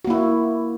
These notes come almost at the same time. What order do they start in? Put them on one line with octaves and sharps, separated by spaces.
F#4 A#3 E4